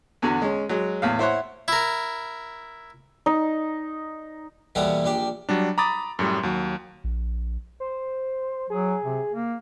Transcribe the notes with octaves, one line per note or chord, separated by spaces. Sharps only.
E2 D3 F#4 A#5
G#3 C#4
F#3 G#3
E2 A2 F5
E4 C5 C#5 F#5
E4 A#4
D#4
D#2 B2 E3 G3 B3 A4
A#1 D4 G4
F#3 G3 D4
A#5 B5 D6 D#6 A6
F#2 A2 G3
D#2 F#3
A#1
C5
F#3 G#4
C3
A#3